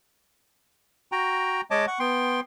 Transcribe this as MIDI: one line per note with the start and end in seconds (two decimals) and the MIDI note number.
1.12 1.61 66
1.12 1.61 79
1.12 1.61 82
1.71 1.86 56
1.71 1.86 73
1.71 1.86 75
1.71 1.86 81
1.71 1.86 86
1.87 1.99 78
1.87 1.99 85
1.99 2.40 59
1.99 2.40 79
1.99 2.40 84